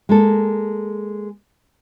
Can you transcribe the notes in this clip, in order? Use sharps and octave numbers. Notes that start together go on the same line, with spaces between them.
G#3 A#3 A4